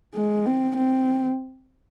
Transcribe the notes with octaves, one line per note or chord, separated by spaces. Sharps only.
G#3
C4
C4